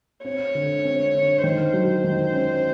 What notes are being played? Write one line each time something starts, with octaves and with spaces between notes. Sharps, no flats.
C4 C#5
D3
C4
D3
D#3 C5
F#3
D#3
C#4